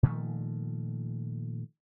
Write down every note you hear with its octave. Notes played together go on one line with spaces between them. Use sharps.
A#2 D#3 F3 A3